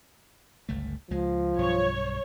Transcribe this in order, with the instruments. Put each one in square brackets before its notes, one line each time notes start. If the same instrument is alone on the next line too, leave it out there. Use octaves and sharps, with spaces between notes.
[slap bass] G1 C#2 A3
[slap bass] C#2 G#3 [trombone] F3
[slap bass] B1 G2 [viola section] C#5